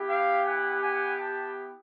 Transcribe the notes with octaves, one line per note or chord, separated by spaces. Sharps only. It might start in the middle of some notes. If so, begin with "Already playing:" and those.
Already playing: B3 E4 G4
F5 G5
F#5 G#5
F#5 G#5
G5 A5